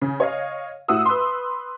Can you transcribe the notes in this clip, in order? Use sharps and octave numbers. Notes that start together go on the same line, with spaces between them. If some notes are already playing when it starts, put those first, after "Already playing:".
C#3
C#5 D#5 F5
A2 F#4 F#5 D#6 E6
B4 C6